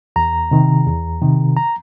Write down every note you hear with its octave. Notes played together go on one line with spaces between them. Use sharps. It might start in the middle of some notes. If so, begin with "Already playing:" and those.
E2 A#5
C3 D#3
E2
C3 D#3
A#5